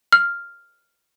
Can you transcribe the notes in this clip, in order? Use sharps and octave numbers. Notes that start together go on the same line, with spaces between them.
F6